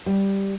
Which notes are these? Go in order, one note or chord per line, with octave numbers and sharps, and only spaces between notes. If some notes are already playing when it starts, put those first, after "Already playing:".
G3